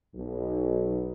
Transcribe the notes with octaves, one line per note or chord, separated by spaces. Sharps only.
B1